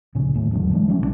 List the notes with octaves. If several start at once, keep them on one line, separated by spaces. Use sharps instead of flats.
D1 A#1 C#3 C#4
D#2 A2
G#1 E2 D3 F#3
E3 G#3 D4
F3 G3 C#4
B1 B2 G#3 D4